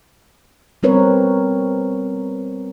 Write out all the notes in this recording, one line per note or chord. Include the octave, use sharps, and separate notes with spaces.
G3 B3 C4 A#4 B4 C#5